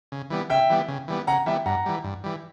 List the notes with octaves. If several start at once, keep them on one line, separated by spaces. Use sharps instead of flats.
C#3
E3 G3 B3
C#3 E5 G5
E3 G3 B3
C#3
E3 G3 B3
C#3 F#5 A#5
E3 G3 B3 E5 G5
G2 F#5 A#5
E3 G3
G2
E3 G3